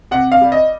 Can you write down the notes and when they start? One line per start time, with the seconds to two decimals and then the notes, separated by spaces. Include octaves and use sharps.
0.11 C3 F#5
0.32 F5
0.41 G3
0.52 D#5